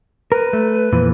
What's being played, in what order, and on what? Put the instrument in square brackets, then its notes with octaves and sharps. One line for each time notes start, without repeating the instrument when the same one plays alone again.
[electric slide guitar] A#4 [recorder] B4
[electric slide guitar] A3
F2 A#2 E3